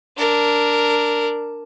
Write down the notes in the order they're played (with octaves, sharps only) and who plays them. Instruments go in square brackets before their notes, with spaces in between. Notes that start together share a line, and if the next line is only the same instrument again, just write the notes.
[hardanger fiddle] D4 A#4